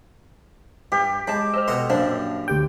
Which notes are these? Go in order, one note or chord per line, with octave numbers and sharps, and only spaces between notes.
G2 G4
G#3 A5 B5
C5 D#5 E6 F6
B2 A4 D#5 C6
A#1 F#2 A#3 D4 C5
D2 G4 G5